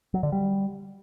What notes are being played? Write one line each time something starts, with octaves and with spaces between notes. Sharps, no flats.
F#3
D3
G3